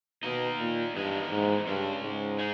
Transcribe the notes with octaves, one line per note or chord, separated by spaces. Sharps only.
B2 D#3 A#3 D#4
A#2
E2 G2 D#3 G#3 D#4
G#2
G2 C#3 G#3 C#4
G#2
D#4 G#4